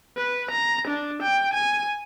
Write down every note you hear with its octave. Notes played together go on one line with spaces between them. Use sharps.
B4
A#5
D4
G5
G#5